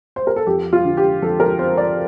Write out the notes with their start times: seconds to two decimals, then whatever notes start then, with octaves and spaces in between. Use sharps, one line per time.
0.16 C5
0.27 A#4
0.36 A4
0.47 F2 G4
0.73 F4
0.85 D3
0.97 G4
1.22 F2 A4
1.40 A#4
1.59 C4 C5
1.78 D5